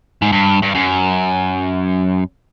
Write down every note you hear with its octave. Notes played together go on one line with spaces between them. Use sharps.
G#2
G2
G2
F#2